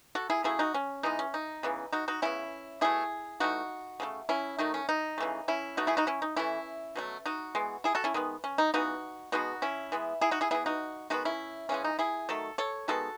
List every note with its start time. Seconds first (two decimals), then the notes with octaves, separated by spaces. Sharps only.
0.15 F#4 A4
0.30 E4 G#4
0.44 C#3 F#3 A3 E4 G#4
0.59 D#4 F#4
0.74 C#4
1.03 E3 G#3 B3 D#4
1.19 C#4
1.34 D#4
1.63 C#3 E3 B3
1.93 D#4 F#4
2.08 D#4 F#4
2.22 C#3 G#3 B3 C#4 E4
2.81 B2 A3 E4 G#4
3.40 E3 A3 D#4 F#4
4.00 C#3 F#3 A3
4.29 C#4 E4
4.59 D#3 F#3 A3 D#4
4.74 C#4
4.89 D#4
5.18 C#3 E3 A3
5.48 C#4 E4
5.77 B2 A3 D#4 F#4
5.87 E4 G#4
5.97 D#4 F#4
6.07 C#4 E4
6.22 D#4
6.36 E3 A3 C#4 E4
6.96 B2 F#3 A3
7.26 D#4 F#4
7.55 E3 G#3 B3
7.84 E4 G#4
7.95 F#4 A4
8.04 C#4 E4
8.14 D#3 G#3 B3
8.44 C#4
8.58 D#4
8.74 C#3 E3 B3 D#4 F#4
9.32 B2 G#3 B3 D#4 F#4
9.62 C#4 E4
9.92 E3 G#3 B3
10.21 E4 G#4
10.31 D#4 F#4
10.41 E4 G#4
10.51 E3 B3 E4 G#4
10.66 D#4 F#4
11.10 D#3 G#3 B3 D#4 F#4
11.25 C#4 E4
11.69 C#3 E3 G#3 C#4
11.84 D#4
11.99 E4 G#4
12.29 D#3 F#3 A3 A4
12.58 A4 C#5
12.88 D#3 G#3 B3 F#4 A4